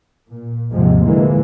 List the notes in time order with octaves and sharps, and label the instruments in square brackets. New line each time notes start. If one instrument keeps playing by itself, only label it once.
[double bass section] A#2
D#2 G#2 C3 F3 G#3
A#2 D3 E3 G#3 A#3